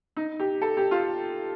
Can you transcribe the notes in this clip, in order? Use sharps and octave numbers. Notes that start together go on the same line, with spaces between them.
D#4
G4
A4
G4
F4